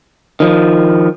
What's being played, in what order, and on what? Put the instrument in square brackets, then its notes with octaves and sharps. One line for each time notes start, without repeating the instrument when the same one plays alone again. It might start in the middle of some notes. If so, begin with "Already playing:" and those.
[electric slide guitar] D#3 F3